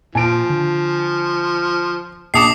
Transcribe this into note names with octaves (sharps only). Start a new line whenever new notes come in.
A#2 F3 G#5 A5 D7
D3
A#1 A5 D6 D#6 C7 C#7